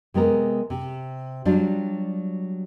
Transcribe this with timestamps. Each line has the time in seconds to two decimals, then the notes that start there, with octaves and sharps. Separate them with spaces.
0.14 C3 G#3 B3 A#4
0.70 C3
1.45 F#3 G3 D4 F4